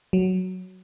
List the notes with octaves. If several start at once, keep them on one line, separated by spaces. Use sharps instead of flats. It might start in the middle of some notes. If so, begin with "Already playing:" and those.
F#3